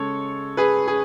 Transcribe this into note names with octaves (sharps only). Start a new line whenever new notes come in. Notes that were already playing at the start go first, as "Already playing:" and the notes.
Already playing: C#3 G#3 A4 C#5
G#4 B4
G#4